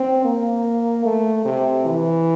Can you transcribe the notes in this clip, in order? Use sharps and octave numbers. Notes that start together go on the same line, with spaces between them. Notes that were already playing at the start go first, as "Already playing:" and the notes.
Already playing: C4
A#3
A3
C3
E3